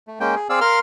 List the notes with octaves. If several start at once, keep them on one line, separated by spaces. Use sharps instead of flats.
A3
G#3 A#3 C#4 G5
G#4
C4 G#4 D5 F5 E6
A#4 F5 C6 F6